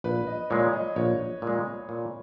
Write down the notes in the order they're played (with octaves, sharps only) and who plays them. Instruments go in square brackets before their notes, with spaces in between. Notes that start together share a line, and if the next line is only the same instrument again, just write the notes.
[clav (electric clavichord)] A#1 [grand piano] B4
[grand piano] D#5
[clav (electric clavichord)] A#2 G#3 [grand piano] C#5
[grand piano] D#5
[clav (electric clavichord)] A#1 [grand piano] C#5
[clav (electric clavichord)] A#2 G#3
A#2